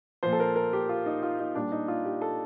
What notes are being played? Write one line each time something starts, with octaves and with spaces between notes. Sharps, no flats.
A#2 F3 C5
A4
A#4
A#4
G4
F4
D#4
F4
D#4
A#2 G3 D4
D#4
F4
G4
A4